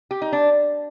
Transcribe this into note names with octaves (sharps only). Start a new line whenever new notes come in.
G4
D#4
D4